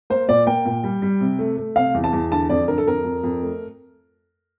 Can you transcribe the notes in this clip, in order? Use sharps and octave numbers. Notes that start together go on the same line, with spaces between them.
A#3 C5
A#2 D5
A#3 G5
A#2
G3
G3
C3
A3
A3
C3 F5
E2
A5
E2
D3 A5
F2 D5
D3 A#4
A4
F2 A#4
F2
F2
A3